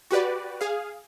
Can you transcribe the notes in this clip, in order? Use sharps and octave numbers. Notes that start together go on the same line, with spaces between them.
F#4 G4 B4 D5
G#4 F5